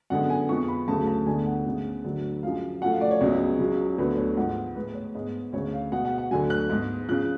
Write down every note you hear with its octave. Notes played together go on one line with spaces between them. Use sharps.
F#2 D3 G#3 B3 F#5
G#5
F2 F3 G#3 B3 C#6
B5
D2 C#3 F#3 A3 A5
A5
D2 D3 G#3 B3 G#5
F#5
D2 C#3 G#3 B3
D2 D3 F#3
F#2 F3 G#3 F5
F#2 F3 A3 F#5
F5
D5
C#5
C#2 C#3 F#3 B3
C#2 C#3 F#3
D2 D3 F#3 B3 B4
C#5
G#2 F3 G#3 B3 F#5
A2 G#3 B3 B4
C#5
G#2 G#3 B3
D2 C#3 G#3 C#5
F5
B2 G#3 B3 F#5
F#5
F#5
D2 D3 F#3 G#5
F#6
G#2 G#3 B3
C#3 F3 F#6